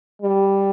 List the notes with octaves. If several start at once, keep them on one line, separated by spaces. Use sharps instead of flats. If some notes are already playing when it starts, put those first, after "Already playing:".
G3